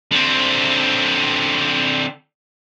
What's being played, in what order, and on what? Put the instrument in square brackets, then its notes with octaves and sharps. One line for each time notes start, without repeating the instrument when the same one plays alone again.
[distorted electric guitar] D3 C4